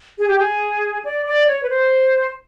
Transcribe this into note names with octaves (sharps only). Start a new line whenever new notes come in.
G#4
G4
G#4
D5
D5
C#5
B4
C5